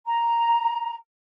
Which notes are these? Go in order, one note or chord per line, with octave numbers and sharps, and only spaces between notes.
A#5